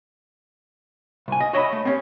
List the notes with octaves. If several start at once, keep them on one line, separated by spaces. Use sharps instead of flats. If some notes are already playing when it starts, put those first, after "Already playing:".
C2 G#5
D#5
F#4 C#5 D#5 E5 G5 B5
A3
C4 C#4 G4